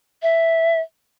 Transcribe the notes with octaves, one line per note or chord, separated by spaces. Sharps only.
E5